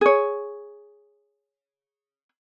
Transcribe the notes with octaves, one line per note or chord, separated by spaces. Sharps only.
G#4 C#5